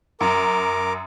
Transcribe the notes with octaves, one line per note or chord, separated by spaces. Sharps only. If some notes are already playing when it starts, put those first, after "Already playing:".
F#2 A#4 D6